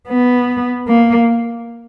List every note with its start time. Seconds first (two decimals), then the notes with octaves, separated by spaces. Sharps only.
0.08 B3
0.88 A#3